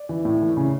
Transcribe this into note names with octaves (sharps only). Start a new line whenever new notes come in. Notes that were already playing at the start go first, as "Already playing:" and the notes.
Already playing: D5
E3
A2
E3
C#3